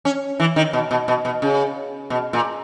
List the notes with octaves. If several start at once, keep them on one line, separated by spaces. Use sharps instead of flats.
C#4
E3
D#3
B2
B2
B2
B2
C#3
B2
A#2